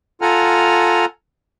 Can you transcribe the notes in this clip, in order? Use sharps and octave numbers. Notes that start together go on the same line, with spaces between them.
F4 A4 F#5 G#5 A#5 F6